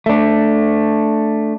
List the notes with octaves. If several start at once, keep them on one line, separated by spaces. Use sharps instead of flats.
A3 D4